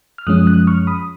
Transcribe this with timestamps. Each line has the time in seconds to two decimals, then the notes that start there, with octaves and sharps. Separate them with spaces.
0.18 F6
0.27 F#2 F3 G#3 C#4 D#6 F#6
0.46 D#6 F#6
0.67 C#6 F6
0.87 B5 D#6